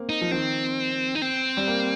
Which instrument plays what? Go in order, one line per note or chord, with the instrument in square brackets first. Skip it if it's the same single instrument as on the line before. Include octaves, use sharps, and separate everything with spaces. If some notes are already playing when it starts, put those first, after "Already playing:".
Already playing: [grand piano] A#3 C4
[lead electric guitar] D#4
[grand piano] F3
[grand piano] D#3 [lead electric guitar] C4
[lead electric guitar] D#4
C4
[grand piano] G3
A#3